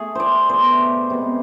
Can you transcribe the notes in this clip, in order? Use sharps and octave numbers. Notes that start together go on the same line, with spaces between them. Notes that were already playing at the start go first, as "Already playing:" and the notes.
Already playing: A3 G#4
C5 D5
B2 A3 C5
C3 G#3 B3